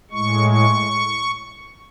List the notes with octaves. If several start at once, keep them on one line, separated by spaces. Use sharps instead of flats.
A2 G#3 C#6
C#6